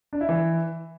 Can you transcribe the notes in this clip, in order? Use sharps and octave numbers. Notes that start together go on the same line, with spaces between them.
D4
E4
E3